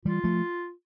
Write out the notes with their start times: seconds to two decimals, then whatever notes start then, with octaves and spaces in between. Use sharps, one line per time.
0.05 E3 G3 F4
0.24 F3 A3